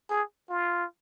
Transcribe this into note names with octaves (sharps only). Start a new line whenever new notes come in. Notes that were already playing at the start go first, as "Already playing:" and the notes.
G#4
F4